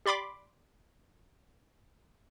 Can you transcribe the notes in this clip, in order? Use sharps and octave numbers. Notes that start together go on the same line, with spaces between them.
G4 D5 B5 C6 D6